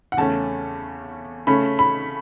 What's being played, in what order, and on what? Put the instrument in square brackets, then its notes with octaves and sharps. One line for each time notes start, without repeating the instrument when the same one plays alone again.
[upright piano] F#5
E2 C#3 A3 C#4 A5
C#3 A3 C#4 B5
B5